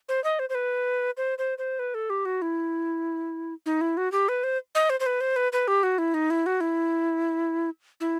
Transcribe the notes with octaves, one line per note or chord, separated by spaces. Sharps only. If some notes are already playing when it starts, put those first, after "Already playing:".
C5
D#5
C5
C5
B4
C5
C5
C5
B4
A4
G4
F#4
E4
D#4
E4
F#4
G4
B4
C5
D#5
C5
C5
B4
C5
B4
B4
G4
F#4
E4
D#4
E4
F#4
E4
E4